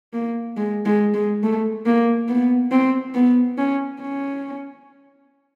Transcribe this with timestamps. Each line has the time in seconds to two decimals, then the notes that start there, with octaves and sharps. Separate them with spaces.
0.13 A#3
0.57 G#3
0.86 G#3
1.14 G#3
1.43 A3
1.86 A#3
2.28 B3
2.71 C4
3.15 B3
3.58 C#4
4.02 C#4